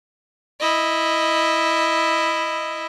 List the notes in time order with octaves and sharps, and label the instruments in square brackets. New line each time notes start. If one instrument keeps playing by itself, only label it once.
[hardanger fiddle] E4 D#5